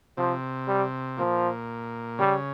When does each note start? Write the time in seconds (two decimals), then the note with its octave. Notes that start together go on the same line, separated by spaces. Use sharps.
0.17 C3 F3
0.68 G3
1.18 A#2 F3
2.19 C#3 G3